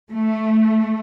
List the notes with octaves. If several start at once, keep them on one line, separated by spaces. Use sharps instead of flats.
A3